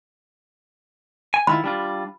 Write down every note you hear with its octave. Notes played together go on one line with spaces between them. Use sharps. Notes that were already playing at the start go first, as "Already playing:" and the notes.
G#5
D#3 E4 F4 B5
G3 D4 F4